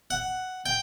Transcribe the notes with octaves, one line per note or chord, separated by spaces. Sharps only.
F#5
G5